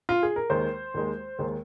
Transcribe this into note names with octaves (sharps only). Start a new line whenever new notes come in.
F4
G#4
A#4
D#2 D#3 G#3 C5
D#2 D#3 G#3
D#2 D#3 G#3